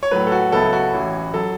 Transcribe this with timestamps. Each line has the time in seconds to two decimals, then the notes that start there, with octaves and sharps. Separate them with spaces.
0.03 C#5
0.11 A2 F#3 A3 B4
0.27 A4
0.32 F#4
0.52 C#2 C#3 F#3 B3 E4 A4
0.73 F#4
0.94 A1 A2 E3 C#4 E4
1.34 F#3 A4